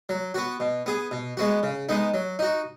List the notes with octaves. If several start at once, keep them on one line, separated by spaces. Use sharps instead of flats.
F#3
B3 F#4
B2
B3 G#4
B2
G#3 B3 F#4
C#3
G#3 B3 D#4
F#3
D#4 F#4